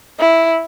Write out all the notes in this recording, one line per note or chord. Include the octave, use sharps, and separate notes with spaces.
E4